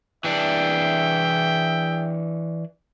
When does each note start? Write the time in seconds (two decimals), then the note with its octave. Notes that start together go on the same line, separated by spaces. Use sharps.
0.24 E3 D4 G#4 E5 G5